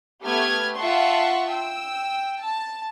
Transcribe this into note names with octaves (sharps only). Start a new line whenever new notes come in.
A3 B3 G4 F6 G#6
F4 E5 F#5 A5 C6 C#6
G5 E6
A5